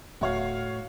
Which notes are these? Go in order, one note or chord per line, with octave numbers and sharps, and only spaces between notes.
D1 A2 F#4 C#5 F5